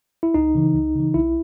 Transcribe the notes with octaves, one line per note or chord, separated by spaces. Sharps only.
E4
C#2 D#4
C#3 E3
C#2
C#3 E3
B1 E4